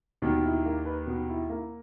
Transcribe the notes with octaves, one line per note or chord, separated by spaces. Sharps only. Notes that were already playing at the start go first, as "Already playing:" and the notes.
D#2 B2 D#3
E4
A#3
B4
B2
E4
A#3